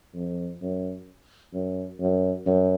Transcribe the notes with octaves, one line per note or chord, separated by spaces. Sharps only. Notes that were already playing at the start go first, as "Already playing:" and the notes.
F2
F#2
F#2
F#2
F#2